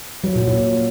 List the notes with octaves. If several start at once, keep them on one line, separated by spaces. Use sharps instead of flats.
F#3
A#2
A#2